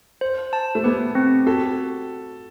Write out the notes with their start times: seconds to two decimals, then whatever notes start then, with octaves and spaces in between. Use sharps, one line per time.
0.21 C5
0.53 A5
0.75 A3
0.84 B3 G4
1.15 C4
1.47 F#4 A4